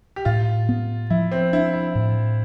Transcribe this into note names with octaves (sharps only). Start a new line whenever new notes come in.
G4
A2 F4
B3
F3 E4
C4
D4 E4
E4
A2